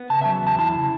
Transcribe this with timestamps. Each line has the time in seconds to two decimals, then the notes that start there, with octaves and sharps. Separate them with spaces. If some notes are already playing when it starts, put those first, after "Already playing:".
Already playing: B3
0.10 C#3 A5
0.21 E5
0.25 F#3
0.42 E2 A5
0.59 E4 A5
0.75 C#3